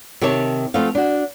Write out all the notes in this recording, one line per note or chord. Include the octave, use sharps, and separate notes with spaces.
C3 D#3 G4 C#5 A5
F3 A3 B3 C4 F5
D4 F#4